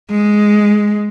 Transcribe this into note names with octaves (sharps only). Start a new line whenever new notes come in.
G#3